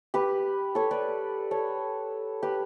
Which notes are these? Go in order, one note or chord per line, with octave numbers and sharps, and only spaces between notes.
G4 B4
A4 C#5
B4 D5
A4 C#5
G4 B4